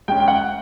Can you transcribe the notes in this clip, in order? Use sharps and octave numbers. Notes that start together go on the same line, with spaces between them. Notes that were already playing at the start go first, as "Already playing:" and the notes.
G#3 C#4 G5
G5
F#5